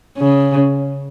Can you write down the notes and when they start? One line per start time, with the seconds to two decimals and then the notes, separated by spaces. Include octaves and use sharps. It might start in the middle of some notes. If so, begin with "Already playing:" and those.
0.17 C#3